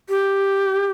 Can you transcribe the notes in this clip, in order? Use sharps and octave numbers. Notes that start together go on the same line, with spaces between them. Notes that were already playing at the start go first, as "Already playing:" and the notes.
G4